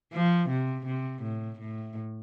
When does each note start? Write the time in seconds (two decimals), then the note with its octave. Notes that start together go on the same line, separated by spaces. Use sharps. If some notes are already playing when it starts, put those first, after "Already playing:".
0.13 F3
0.49 C3
0.86 C3
1.23 A2
1.59 A2